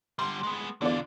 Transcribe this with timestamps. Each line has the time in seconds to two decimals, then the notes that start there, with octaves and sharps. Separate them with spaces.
0.19 D3 G3 C6
0.43 G#3 B3
0.82 E2 D3 D4 F4 D5